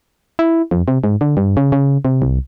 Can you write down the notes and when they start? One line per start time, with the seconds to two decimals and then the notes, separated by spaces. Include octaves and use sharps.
0.39 E4
0.71 F2
0.88 C3
1.04 G#2
1.21 D3
1.37 G2
1.57 C#3
1.72 C#3
2.05 C3
2.22 C2